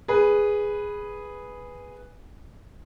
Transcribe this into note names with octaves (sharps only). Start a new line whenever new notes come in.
G#4 B4